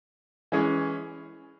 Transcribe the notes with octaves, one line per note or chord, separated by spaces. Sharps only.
E3 G#3 C#4 G#4